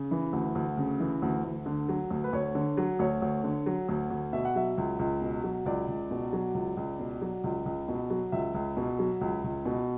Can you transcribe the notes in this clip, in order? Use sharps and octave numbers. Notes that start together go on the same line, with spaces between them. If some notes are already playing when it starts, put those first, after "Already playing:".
Already playing: C#3
E3
D2
D2
C#3
E3
D2
D2
D3
F#3
D2
B4
D2 C#5
D3
F#3
D2 C#5
D2
D3
F#3
D2
D2
B2 E5
F#5
F#3 E5
C#2
C#2
B2
F#3
C#2 D5
C#2
B2
F#3
C#2
C#2
B2
F#3
C#2
C#2
B2
F#3
C#2 E5
C#2
B2
F#3
C#2
C#2
B2